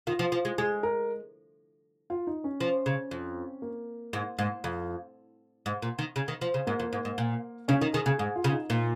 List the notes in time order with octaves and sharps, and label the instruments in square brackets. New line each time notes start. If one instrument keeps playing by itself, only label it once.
[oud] D#3 [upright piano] F4
[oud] F3
F3
G#3
[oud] G#3 [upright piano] G#4
[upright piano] A#4
F4
D#4
C#4
[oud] F3
C#3
F2
[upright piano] A#3
[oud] G#2
G#2
F2
G#2
A#2
D#3
C#3
D#3
F3
C#3
[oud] G#2 [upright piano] A#3
[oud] F2
G#2
G#2
A#2
[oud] C#3 [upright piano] C#4
[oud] D#3 [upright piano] D#4
[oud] D#3 [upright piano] G#4
[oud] C#3 [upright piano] G#4
[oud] G#2 [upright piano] G#4
[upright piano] F4
[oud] C#3
[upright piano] D#4
[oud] A#2